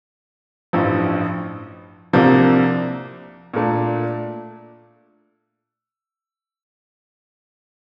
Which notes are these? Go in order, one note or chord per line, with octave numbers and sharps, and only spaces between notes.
A1 G2 F3
C2 C3 F3 A#3 D4
A#2 A3 D4